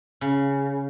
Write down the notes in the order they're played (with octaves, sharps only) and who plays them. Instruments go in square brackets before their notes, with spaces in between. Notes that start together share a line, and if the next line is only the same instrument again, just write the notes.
[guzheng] C#3